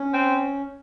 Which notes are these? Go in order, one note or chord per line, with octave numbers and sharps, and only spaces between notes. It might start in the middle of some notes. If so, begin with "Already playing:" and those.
Already playing: C#4
C4